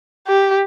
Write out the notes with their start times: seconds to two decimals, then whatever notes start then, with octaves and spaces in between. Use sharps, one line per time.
0.28 G4